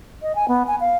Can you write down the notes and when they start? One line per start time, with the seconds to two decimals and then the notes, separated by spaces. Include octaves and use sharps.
0.22 D#5
0.35 G#5
0.48 B3
0.67 G#5
0.80 F5